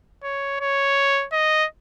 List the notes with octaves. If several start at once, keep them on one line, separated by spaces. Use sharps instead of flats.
C#5
C#5
D#5